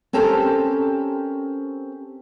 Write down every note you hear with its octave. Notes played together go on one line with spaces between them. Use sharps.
C4 C#4 G4 A4 A#4 C5